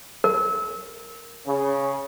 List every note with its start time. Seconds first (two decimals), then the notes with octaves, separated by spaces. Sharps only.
0.24 A#4
1.46 C#3